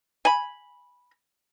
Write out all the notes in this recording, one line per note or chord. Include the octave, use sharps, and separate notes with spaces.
G#5 B5